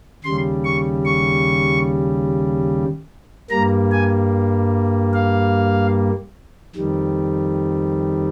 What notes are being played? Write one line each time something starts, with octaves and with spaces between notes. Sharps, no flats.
D#2 C#3 G3 C6
C#6
C#6
G2 G3 A#3 A#5
G#5
F5
F2 D#3 G3